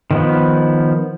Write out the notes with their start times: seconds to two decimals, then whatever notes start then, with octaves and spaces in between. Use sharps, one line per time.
0.11 D#3 F3 B3